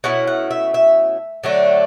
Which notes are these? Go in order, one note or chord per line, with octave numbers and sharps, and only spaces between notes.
B2 A3 C#4 E4 F#5
F#5
E5
E5
D3 F#3 A3 D4